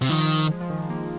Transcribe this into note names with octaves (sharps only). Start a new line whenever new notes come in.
C3
D#3 F3
G#3
F3
D#3
A#3